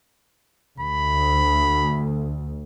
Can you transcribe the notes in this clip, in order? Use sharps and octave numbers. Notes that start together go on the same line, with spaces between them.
D2 B5